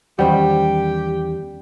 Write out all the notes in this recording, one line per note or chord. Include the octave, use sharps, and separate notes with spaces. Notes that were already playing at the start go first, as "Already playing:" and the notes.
E2 D#3 G3 C#4 G4 C5 F#5